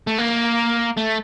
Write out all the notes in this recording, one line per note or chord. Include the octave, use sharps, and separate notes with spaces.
A3
A#3
A3